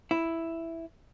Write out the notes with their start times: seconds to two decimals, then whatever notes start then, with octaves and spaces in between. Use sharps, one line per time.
0.11 E4